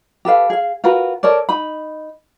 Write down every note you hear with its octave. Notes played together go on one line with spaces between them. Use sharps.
G4 A4 B4 F5
G#4 F5
F4 F#4 A#4 B4
A4 A#4 C#5 D5
D#4 B5